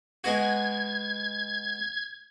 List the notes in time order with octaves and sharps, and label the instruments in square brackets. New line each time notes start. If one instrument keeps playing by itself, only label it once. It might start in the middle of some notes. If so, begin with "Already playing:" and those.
[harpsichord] G#3 B3 F#4 [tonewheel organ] G#6